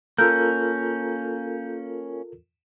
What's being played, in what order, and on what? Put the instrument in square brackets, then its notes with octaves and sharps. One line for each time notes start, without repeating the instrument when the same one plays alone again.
[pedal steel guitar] A#3 C#4 [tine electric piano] F4 A4 A#4 [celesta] G6